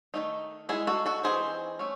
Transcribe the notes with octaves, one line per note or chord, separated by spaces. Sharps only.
D#3 F#3 A3 D#4
G#3 D#4 E4 G#4
F#4 A4
F#4 A4
E3 C4 D#4 G#4 C5
A3 C#4